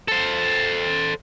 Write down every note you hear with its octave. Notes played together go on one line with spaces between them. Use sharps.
A4 C5